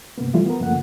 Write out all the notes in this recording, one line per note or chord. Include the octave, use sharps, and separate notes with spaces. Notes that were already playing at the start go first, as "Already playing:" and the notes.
G2 C3 A#3 B3
E3 F3 G3 A3 E4 F4
B3 A#4
F#2 C#3 F3 A3 A#3 F#5